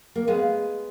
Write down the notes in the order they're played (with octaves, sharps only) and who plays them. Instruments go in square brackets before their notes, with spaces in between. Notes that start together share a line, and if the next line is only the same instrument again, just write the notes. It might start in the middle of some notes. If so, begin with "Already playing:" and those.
[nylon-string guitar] A#3
[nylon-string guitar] G#3 B3 [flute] F5